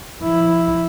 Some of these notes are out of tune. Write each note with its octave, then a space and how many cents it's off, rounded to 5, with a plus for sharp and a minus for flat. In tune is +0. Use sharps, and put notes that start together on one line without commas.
F3 -30 E4 +0